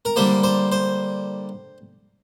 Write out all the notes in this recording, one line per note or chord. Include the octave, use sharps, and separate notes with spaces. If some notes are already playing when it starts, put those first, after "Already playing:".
A#4
D3 G3 A#3 C5
C5
C5